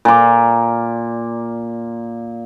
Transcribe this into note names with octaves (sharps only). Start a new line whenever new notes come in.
A#2 D6